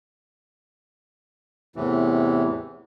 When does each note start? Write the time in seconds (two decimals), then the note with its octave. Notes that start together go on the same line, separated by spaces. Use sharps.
1.76 E2 A2 C3 E3